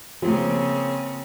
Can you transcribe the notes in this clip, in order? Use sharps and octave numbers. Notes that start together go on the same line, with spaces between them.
C#3 F3 A#3 C4